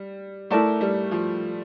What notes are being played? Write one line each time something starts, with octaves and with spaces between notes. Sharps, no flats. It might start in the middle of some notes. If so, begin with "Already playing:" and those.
Already playing: G3
A3 E4 A#4 D5 A5
G3
F3